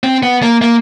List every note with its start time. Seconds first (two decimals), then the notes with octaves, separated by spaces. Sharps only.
0.04 C4
0.23 B3
0.43 A#3
0.62 A#3